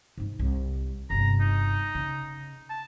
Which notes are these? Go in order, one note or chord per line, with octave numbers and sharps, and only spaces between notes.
G#2 D#4
C2
G1 C3 A#5
D#4
C#3
A5